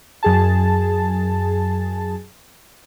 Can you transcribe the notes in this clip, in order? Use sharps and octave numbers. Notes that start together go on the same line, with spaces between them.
F#2 G#4 A5